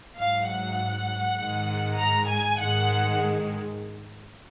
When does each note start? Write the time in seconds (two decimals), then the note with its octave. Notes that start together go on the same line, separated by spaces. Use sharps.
0.17 G#2 F#3 F5
0.48 F#5
1.39 G#2 D#3 G#3
1.99 A#5
2.29 G#5
2.59 G#2 D#3 G#3 F#5